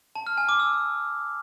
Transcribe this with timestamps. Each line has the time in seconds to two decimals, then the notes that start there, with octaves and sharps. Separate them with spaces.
0.15 A5
0.27 F6
0.38 G#5
0.49 D6
0.60 E6